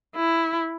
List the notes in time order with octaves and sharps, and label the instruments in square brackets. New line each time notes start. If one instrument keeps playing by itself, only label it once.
[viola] E4